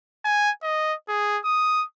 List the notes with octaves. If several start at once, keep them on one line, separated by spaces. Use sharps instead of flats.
G#5
D#5
G#4
D#6